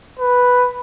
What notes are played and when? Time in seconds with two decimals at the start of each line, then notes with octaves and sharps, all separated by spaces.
0.19 B4